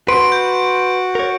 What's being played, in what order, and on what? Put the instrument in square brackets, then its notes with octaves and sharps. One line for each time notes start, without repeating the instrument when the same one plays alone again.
[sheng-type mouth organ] F#4 [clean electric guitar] B4 [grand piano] C6 [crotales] D7
[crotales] G6
[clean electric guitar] A#4 C#5